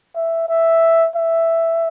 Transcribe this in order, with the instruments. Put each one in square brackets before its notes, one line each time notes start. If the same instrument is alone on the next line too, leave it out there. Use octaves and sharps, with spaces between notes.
[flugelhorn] E5
E5
E5